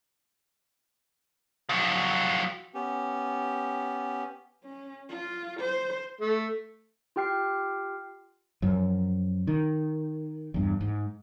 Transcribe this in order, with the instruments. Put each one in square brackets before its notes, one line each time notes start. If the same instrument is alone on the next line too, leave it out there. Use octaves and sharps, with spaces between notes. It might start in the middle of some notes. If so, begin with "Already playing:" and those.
[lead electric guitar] F3 F#3
[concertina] B3 C#4 G4
[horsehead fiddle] C#4
F4
C5
[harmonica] A3
[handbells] F4 G4 G5 F6 C7
[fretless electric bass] F#2 F3
D#3
E2 G2
G#2